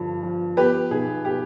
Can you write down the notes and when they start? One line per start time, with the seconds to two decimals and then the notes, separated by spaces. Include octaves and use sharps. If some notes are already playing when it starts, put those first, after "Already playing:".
Already playing: G2 D3 F3
0.23 F3
0.57 B3 G4 B4
0.91 B1 G#4
1.25 B2 G4